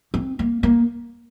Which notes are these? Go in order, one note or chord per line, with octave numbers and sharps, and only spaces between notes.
C4
A#3
A#3